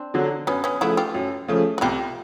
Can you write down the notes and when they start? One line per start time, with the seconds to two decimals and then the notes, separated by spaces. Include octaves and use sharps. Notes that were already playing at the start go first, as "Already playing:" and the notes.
Already playing: C4 D4
0.14 D3 F#3
0.47 F#2 B3 C#4
0.64 B3 C#4
0.81 C#3 F3 A3 E4 F#4
0.97 F4 G4
1.15 F#2
1.48 C#3 F3 A3
1.78 F#4
1.81 C2 F4 G4